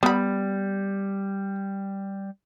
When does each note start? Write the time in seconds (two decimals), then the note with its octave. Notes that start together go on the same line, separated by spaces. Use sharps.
0.03 G3 B3 B5